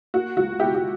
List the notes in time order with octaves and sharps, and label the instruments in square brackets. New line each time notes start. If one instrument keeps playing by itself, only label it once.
[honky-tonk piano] A#3 F#4
C#2 F#4
B2 E4 G4
G4